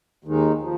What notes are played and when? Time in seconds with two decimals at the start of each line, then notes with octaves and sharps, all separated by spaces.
0.24 D#2 D#3 G#3 D#4
0.62 F3